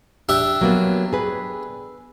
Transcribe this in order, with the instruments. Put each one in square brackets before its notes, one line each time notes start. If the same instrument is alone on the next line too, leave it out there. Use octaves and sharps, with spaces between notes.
[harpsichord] D4 G4 E5
[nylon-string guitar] F#3 A#3 B3
G#4 B4